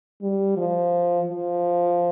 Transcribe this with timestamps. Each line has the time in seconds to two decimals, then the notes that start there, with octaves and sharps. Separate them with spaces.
0.22 G3
0.57 F3
1.28 F3